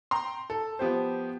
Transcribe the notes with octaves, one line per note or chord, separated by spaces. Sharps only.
G5 A#5 C6
A4
F3 B3 G4 C5